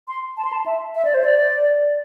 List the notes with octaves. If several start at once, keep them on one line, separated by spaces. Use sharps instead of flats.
C6
A5
C6
A5
E5
E5
D5
C5
D5